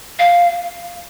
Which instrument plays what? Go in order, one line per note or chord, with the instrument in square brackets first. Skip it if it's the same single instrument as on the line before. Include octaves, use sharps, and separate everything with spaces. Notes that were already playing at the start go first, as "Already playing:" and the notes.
[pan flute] F5